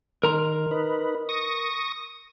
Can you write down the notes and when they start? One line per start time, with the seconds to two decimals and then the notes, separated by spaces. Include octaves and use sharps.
0.23 D#3 A#4 A#5 C6
0.71 D#4 B4
1.29 C#6 D#6 A#6